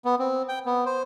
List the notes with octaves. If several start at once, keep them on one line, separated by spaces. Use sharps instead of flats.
B3
C4
G5
B3
C5